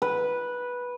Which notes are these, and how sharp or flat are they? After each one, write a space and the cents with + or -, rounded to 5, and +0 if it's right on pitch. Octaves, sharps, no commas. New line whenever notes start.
B4 -10